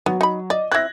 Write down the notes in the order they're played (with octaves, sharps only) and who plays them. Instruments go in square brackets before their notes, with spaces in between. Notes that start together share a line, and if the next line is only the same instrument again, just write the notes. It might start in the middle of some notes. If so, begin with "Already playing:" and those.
[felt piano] F#3 [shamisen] B3
[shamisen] D#4 B5
[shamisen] D5 [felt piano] D#5
[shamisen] C4 E4 [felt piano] F#6 G#6 A#6